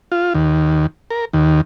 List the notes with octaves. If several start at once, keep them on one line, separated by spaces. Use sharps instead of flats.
F4
D#2
A#4
D#2